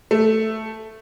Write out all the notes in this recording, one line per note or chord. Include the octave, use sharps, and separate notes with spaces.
A3